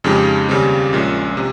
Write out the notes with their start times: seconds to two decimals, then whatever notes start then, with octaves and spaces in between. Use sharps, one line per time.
0.04 F2 C#3 G#3 D#4 G4
0.49 D#2 C#3 G3 C4 G4
0.93 A#1 A#2 G#3 C#4
1.37 C3